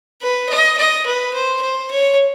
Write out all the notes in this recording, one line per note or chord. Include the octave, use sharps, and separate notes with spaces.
B4
D#5
D#5
B4
C5
C5
C#5